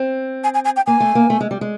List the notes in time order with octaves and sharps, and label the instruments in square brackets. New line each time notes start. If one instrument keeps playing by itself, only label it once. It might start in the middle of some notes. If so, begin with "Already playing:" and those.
Already playing: [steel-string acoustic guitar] C4
[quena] G#5
G#5
G#5
G5
[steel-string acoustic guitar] A#3 [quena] G#5
[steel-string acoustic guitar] A3
A#3
A3
G#3
G3
G#3